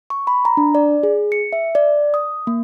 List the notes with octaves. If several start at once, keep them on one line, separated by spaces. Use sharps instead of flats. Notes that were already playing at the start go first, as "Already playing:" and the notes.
C#6
B5
A#5
D4
D5
G#4
C#7
E5
D5
D#6
A#3